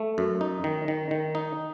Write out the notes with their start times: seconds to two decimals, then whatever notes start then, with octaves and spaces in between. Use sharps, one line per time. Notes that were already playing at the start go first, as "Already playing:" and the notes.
Already playing: A3
0.18 F#2
0.41 D#4
0.64 D#3
0.88 D#3
1.11 D#3
1.35 D#4